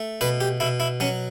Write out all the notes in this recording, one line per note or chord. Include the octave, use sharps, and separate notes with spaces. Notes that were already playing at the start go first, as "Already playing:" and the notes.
Already playing: A3
B2 B4
G4
B2 E4
E4
F#3 C#4